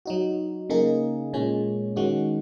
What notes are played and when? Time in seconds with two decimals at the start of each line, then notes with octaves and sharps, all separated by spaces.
0.06 F#3 D#4 F#4
0.70 C#3 A#3 D#4 G#4
1.33 A#2 G#3 C#4
1.96 D#3 G#3 C#4 F#4